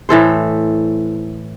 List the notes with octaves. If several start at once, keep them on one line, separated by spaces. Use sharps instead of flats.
A2 E3 A4 C5